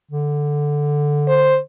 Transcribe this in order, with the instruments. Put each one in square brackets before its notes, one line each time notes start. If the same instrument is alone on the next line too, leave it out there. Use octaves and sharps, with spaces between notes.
[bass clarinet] D3
[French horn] C5